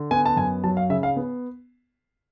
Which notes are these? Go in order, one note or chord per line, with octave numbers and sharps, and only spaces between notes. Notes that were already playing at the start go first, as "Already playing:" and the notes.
Already playing: D3
B3 G#5
A5
F#2 G#5
F#3 A5
F5
C#3 E5
F5
B3